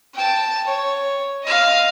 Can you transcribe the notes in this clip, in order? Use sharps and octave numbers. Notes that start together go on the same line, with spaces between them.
G5 A5
C#5
D#5 F5